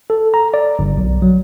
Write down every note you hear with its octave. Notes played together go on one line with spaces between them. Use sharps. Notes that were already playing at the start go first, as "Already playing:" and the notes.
A4
A#5
D5
G1
B1
F#3